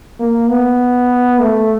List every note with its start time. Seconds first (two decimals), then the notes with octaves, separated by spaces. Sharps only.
0.20 A#3
0.49 B3
1.40 A3